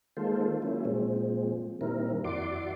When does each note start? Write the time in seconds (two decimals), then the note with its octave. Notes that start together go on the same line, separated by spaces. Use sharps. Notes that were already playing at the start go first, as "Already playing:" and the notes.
0.17 D#3 G#3 A#3 F4 A4 C5
0.62 F#3 A#3 C#4 E4
0.85 A#2 F3 G#3 C4
1.81 A#2 D#3 G3 C4 E4 A#4
2.24 F2 E4 F#4 D5 C6 D6